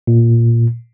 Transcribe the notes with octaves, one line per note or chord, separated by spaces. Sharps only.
A#2